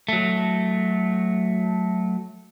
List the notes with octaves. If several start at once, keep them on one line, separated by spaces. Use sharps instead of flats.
F#3 A3